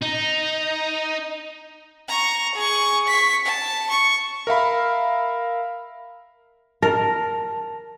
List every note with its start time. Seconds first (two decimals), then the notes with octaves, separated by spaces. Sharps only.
0.02 D#4
2.08 A#5 C#6
2.54 G#4 C#6
3.07 C#6 B6
3.45 A5
3.89 C#6
4.47 A#4 E5 F5 B5
6.82 A#4 A5